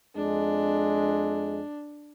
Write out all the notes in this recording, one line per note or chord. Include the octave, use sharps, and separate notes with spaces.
F2 G#3 D4